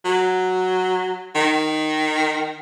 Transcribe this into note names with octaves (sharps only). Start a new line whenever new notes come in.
F#3
D#3